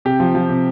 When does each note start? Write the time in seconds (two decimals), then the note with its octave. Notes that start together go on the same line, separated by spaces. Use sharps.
0.05 C3 G4
0.20 F3
0.35 F3
0.49 C3